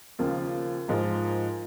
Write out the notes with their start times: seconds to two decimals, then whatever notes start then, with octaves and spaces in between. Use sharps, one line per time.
0.19 D#2 C#3 F3 A#3
0.88 G#2 F3 A#3